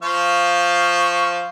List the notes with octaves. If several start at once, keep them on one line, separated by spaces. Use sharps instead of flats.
F3 F5 C#6